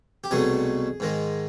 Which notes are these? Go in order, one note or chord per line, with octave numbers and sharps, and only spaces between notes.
G4
C2 B2 F#3 A3 G#4
G#2 D#3 G#3